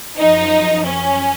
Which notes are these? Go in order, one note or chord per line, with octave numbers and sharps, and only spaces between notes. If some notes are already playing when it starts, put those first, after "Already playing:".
F#2 F3 D#4
C#4